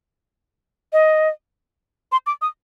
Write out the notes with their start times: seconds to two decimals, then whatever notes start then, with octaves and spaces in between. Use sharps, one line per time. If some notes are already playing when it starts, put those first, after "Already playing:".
0.93 D#5
2.12 C6
2.26 D6
2.42 D#6